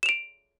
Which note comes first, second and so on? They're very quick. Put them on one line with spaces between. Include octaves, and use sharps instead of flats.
E7 F7 D7